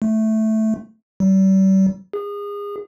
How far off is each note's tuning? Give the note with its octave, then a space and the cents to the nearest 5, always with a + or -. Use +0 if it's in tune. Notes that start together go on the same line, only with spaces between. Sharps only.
A3 -5
G3 -40
G#4 -30